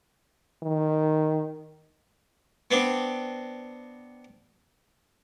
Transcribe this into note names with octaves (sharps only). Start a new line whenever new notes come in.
D#3
B3 C4 D4